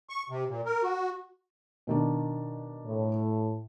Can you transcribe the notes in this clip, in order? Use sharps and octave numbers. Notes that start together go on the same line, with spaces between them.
C#6
C3
A#2
A#4
F#4
B2 D#3 D4
A2